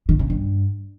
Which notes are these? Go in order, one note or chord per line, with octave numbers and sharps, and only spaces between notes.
D#3
C#3
G2